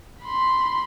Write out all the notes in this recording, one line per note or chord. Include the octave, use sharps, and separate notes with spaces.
B5 C6